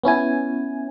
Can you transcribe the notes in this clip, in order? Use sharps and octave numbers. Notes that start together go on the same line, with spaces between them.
B3 C#4 E4 G#5